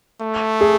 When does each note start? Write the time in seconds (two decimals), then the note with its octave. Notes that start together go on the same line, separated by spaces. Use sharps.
0.22 A3
0.61 G#4